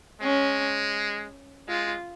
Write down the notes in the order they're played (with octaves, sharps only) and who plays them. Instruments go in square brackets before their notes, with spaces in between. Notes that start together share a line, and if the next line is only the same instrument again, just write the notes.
[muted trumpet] G#3 [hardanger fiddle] C#4
[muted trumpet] G#3 [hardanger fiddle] F4